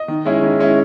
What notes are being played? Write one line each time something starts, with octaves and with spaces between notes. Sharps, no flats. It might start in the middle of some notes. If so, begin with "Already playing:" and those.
Already playing: D#5
D#3
G#3 C#4 E4
D#3
G#3 C#4 E4